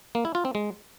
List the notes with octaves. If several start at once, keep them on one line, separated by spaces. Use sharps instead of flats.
A#3
E4
F4
C4
G#3